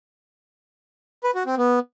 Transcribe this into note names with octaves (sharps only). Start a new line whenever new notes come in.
B4
F#4
C4
B3